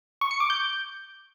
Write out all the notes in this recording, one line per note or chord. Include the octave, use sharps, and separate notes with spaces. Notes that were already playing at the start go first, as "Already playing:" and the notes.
C#6
C#7
D6
G6